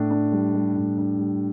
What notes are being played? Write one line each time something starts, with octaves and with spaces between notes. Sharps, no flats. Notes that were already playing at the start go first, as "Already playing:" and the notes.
Already playing: A2 D4
D4
G3
G3
A2
D4
G3